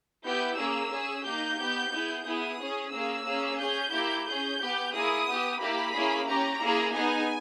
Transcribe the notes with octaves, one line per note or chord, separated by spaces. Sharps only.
B3 E4 G4 G6
A#3 C#4 G#4 E6
C#4 G#4
A#3 D#4 G4 G6
B3 G4
B3 E4 G#4
B3 E4 G#4 D#6
C#4 G#4
A#3 C#4 G#4 E6
A#3 C#4 G#4
C#4 G#4 G6
A#3 E4 G4
C#4 G#4 G6
B3 G4
A#3 E4 G#4 D#6
B3 G4
A#3 E4 G4 B5
A#3 C#4 E4 G#4
C#4 G4 A#5
A#3 E4 G#4
B3 D#4 G#4 G#5